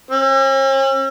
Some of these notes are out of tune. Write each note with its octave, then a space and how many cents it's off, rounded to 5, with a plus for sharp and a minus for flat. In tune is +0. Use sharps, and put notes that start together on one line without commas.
C#4 -45